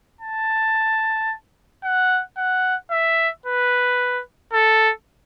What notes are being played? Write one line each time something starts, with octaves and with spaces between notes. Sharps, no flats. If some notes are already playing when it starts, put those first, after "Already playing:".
A5
F#5
F#5
E5
B4
A4